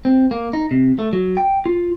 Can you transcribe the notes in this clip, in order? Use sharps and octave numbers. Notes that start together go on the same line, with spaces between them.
C4
A#3
D#4
C3
A3
F#3
G5
F4